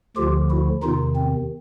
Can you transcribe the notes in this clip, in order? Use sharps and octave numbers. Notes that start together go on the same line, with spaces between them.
D2 D3 F3 F4 G4
E4 F#4
E2 C3 D#3 D#4 F4
C4